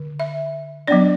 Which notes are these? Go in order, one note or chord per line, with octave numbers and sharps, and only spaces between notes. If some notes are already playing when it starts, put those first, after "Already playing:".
Already playing: D3
E5
F#3 B3 D4 D5